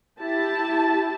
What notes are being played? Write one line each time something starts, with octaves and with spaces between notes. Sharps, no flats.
E4 G4 A5